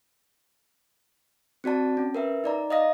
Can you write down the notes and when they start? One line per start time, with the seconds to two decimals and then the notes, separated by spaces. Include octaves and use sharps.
1.64 C4 F#4 D5 A5
1.97 C#4
2.15 A#4 B4 E5
2.44 D#4 D5 A#5
2.70 D#5 F5 D#6 A#6